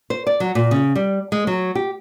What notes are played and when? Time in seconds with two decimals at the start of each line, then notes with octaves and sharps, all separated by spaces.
0.10 C5
0.27 D5
0.40 F#3
0.55 A#2
0.71 C#3
0.95 G3
1.32 G#3
1.47 F#3
1.75 G4